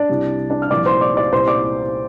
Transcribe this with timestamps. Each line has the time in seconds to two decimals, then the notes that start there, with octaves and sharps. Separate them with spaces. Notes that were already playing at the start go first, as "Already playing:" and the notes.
Already playing: D4 D5
0.09 C2 C3 G3
0.50 D4 D5
0.62 F6
0.71 C2 A#2 F3 D5 D6
0.86 C5 C6
1.01 D5 D6
1.17 D5 D6
1.32 C2 A#2 G3 C5 C6
1.48 D5 D6